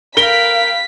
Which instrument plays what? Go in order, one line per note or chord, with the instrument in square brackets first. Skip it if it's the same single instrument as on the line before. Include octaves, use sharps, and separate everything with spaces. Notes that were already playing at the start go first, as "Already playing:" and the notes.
[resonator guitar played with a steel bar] A#4 [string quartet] F5 G5 B5 [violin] B6 [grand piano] G7